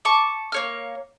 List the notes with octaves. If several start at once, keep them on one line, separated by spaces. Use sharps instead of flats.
A5 C#6 D6
A#3 C#5 F6